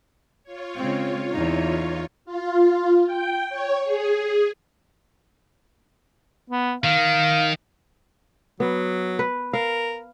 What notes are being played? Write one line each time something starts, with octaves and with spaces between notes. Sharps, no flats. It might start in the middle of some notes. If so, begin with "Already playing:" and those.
F4 C#5
C#3 G#3 C4
E2 E3 D#4
F4
G5
C#5
G#4
B3
D#3 F5
F#3 B3
B4
A#4 F5